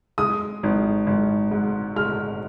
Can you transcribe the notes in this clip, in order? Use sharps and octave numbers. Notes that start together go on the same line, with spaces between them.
G#3 D#6
G#1
G#1
G#2
G#3 F6